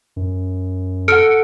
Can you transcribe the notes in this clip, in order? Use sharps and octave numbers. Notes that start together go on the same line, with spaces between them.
F#2
A4 F#5 F6 C#7 D7